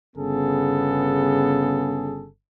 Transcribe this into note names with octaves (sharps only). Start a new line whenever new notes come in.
G1 C#3 B3 G#4 A4